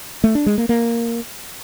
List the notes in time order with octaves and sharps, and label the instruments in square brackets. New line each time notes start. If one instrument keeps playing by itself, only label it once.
[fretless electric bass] A3
D4
G#3
A#3
A#3